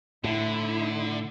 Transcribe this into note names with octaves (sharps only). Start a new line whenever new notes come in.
A2 D3 E4